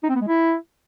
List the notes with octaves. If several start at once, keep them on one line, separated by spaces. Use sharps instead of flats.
D#4
C4
B3
G#3
E4